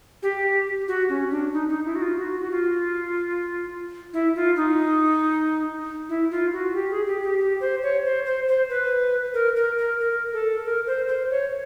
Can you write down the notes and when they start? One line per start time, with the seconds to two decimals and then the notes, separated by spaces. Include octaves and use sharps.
0.23 G4
0.88 F#4
1.09 C#4
1.31 D4
1.53 D#4
1.69 D#4
1.85 E4
1.95 F#4
2.02 F4
2.18 F#4
2.40 F#4
2.51 F4
4.13 E4
4.35 F4
4.56 D#4
6.09 E4
6.31 F4
6.53 F#4
6.74 G4
6.90 G#4
7.07 G4
7.23 G4
7.39 G4
7.60 C5
7.83 C#5
8.05 C5
8.25 C5
8.48 C5
8.69 B4
9.34 A#4
9.56 A#4
9.78 A#4
10.00 A#4
10.33 A4
10.65 A#4
10.87 C5
11.08 C5
11.30 C#5